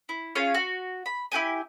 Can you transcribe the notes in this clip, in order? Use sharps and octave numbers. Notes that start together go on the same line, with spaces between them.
E4
C#4 F4 G#4 F5
F#4
B5
E4 F#4 G4 G#5